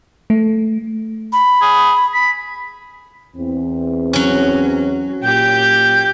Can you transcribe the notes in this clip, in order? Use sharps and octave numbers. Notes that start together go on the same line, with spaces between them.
A3
B5
G#4
B5
E2 C4
F#3 C#4
A#2 G4 G6